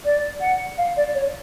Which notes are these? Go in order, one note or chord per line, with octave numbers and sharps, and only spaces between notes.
D5
F#5
F5
D5
C#5